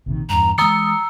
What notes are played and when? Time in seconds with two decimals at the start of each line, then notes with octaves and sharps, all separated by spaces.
0.06 A#1 C3 D#3
0.29 E2 G2 A#5
0.58 E3 G#3 A#5 D#6 E6 C#7